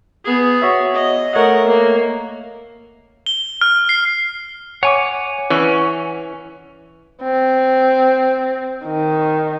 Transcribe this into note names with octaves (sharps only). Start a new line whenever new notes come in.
B3 G#4
F#4 C#5 E5
D#5
A3 A#4 C#5 D#5 F#5
A#3
G7
F6
C7
C#5 F#5 G#5 D6
E3 C#4
C4
D#3